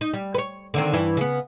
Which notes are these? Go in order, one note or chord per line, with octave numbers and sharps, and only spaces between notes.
D#4
G3
B4 C#5
D3 D#3 C4
G2 E3 E4
C#3 B3